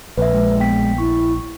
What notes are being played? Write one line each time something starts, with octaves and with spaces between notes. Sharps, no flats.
A#1 B4 E5
G#3
B3 G5 B6
E4 C#6